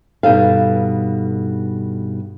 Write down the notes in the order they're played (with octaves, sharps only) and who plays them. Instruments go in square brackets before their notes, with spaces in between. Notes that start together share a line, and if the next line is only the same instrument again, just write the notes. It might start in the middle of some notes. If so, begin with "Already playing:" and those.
[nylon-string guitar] G2 B2 D#4 A4 F5